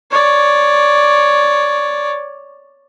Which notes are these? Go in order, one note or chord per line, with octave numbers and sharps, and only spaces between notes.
C#5 D5